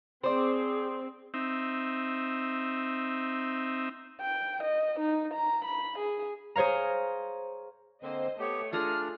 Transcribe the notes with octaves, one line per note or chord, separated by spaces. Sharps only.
C4 G#4 C5 D5
C4 D#4 E5
G5
D#5
D#4
A#5
B5
G#4
G#4 C5 C#5 F5 A#5
D3 A#3 C4 C5 D#5
A3 B3 G4 C#5
D4 F4 G#4 D5 A#5 F6